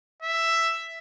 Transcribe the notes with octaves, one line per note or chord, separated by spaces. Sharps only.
E5